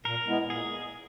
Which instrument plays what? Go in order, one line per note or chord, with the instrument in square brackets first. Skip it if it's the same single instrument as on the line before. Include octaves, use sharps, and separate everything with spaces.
[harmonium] A#2 [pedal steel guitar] A#4
[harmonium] G#3 B3 E4
[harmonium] A#2 [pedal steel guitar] G#4